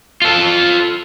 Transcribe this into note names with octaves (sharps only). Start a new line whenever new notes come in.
F4 A4